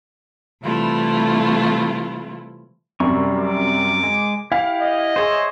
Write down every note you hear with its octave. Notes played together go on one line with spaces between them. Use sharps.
C3 E3 G3 A3 E4 F4
F#2 C3 G3 C#6
D6
G#3
E4 G4 F5
D#5
G#4 C5 C#5 E5 C6